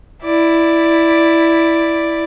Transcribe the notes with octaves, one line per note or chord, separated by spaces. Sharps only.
E4 D5